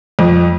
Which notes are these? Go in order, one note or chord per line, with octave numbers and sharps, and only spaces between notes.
F2